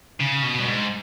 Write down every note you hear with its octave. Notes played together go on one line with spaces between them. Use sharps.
C#3
B2
G2
G#2